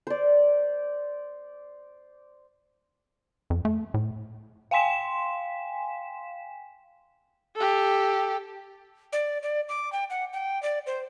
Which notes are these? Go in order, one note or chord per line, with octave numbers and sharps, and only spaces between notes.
C5 D5
F2
A3
A2
F5 G5 G#5 C6 B6 E7
G4 A4
D5
D5
D6
G5
F#5
G5
D5
C5